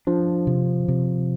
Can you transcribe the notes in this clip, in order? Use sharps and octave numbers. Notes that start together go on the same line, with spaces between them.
F3 D4
C3
C3